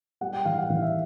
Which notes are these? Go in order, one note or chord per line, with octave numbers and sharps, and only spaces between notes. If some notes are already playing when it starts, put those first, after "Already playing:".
G3 F#5
G5
E3 F5
F#5
E3 F5
E5